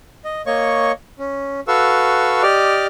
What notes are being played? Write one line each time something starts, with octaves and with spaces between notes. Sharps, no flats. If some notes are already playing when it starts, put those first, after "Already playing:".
D#5
A#3 C#5 D#5 C#6
C#4
F#4 A4 B4 F5 C#6 E6
G4 D5 D#5 D6 F6